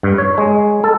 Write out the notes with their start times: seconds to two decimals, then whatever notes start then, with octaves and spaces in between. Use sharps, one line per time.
0.03 G2
0.18 C#5
0.38 G#3
0.84 A4